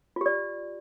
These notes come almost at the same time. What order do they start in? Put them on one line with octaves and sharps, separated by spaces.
F4 G4 D5